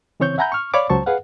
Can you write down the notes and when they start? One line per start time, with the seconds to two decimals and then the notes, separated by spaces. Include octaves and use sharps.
0.20 C#3 E3 C4 C#5 C#6 G6
0.38 E5 F#5 G#5 A#5 B5 G6
0.52 C#6 F6
0.74 C#5 D5 F5 B5 D6
0.89 C#2 F#3 C5 A5 C#6
1.06 G#4 B4 F5 F#5